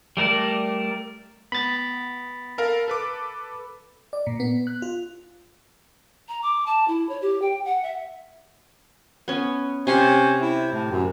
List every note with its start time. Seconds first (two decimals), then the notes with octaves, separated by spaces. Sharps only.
0.17 G3 A3 A#4 D5
1.52 B3 B5 A6
2.58 A4 A#4 F5
2.88 A4 B4 D6
4.13 D5
4.27 A#2
4.40 B3
4.67 F#6
4.82 F4
6.29 A#5
6.42 D6
6.66 A5
6.88 E4
7.09 C#5
7.22 G4
7.42 G5
7.65 F#5
7.83 E5
9.28 B3 C#4
9.87 C3 C#4 C6
10.41 E4
10.72 A2
10.91 F#2